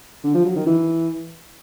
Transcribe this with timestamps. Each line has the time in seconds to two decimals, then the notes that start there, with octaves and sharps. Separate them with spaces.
0.24 D3
0.35 F3
0.45 F#3
0.56 D#3
0.66 E3